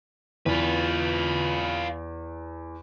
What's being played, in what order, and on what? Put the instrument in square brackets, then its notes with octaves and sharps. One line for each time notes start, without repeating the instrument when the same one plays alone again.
[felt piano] E2 [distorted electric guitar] F4 B4